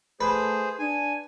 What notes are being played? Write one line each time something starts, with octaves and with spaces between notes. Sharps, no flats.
A3 G#4 B4 C5
D4 G#5